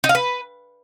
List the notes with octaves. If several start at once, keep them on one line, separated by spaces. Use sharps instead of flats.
D#4
F5
B4